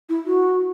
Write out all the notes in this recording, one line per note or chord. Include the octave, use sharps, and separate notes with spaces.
E4
F#4